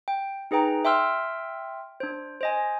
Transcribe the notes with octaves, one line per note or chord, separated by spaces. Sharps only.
G5
D#4 G#4 B4 G5 A#5
E5 G5 C6 E6 F6
D4 C5
C5 D#5 G#5